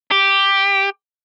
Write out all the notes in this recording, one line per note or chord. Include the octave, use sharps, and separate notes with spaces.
G4